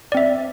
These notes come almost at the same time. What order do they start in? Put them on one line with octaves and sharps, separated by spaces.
D5 C4 E5